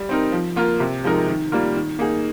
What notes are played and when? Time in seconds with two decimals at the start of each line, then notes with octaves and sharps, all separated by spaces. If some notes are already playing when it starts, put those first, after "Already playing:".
Already playing: G3
0.09 C4 D#4 A#4
0.32 F3
0.56 A#3 F4 A#4
0.80 C3
1.04 F3 G#3 D#4 A#4
1.28 D#3
1.52 G3 A#3 F4 A#4
1.75 D#3
1.99 A#3 D#4 G#4